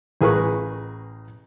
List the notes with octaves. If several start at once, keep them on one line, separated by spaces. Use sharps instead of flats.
A1 G#4 A#4 B4 C#6